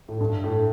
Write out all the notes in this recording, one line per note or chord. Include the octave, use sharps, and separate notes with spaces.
A2
G2
A2